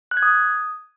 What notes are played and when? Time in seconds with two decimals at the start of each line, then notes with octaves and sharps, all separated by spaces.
0.11 F#6
0.17 G#6
0.22 D#6